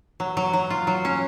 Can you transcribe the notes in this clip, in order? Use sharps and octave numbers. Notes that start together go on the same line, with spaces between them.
F#3
F#3
F#3
F4
F#3
C#4